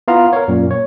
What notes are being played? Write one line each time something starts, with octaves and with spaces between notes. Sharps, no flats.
B3 E4 F4 F5 A#5
A#4 C#5
F#2 A#2
C#5